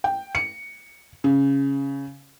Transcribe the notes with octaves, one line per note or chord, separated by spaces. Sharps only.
G5
C#7
C#3